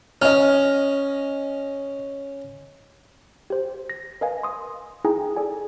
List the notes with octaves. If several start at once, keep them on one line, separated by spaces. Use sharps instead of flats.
C#4 D#5 F6
G4 C5
A#6
A#4 B4 D#5 F5 G#5
C6 D#6
D#4 E4 G#4 G5 G#5 A#5
G#4 A4 D5 G#5